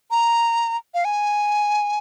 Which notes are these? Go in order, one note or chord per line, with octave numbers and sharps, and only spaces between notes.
A#5
F5
G#5